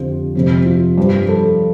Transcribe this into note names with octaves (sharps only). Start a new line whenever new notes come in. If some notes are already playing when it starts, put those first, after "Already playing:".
Already playing: F2 D3 F3 F4 G4
F2 C3 F3
F4
G2 F3
A4